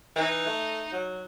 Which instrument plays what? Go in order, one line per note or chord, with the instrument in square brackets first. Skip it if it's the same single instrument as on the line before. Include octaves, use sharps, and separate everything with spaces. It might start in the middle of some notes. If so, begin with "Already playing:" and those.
[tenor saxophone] E3 [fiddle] D#4
[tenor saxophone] A3
F#3